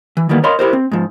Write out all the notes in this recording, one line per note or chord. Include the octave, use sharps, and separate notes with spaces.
E3
D#3 E3 G3 A#3 B3
A#4 C#5 D#5 F5 B5 C6
E4 G4 A#4 C5
C4
G#2 F3